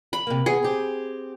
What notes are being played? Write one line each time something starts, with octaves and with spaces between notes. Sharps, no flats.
B5
C3 A#3
B3 G#4
C4 G4